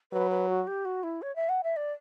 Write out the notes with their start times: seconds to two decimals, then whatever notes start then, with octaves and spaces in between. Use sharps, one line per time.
0.12 F#3 B4
0.31 B4
0.49 F#4
0.67 G4
0.85 F#4
1.03 E4
1.22 C#5
1.36 E5
1.49 F#5
1.64 E5
1.76 D5